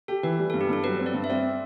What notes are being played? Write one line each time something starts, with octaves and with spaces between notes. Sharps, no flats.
G4 A4
E3 B4
G3
G2 A4
G4
G2 A4
F#3 B4
C4
D5
G2
E5
C4 D5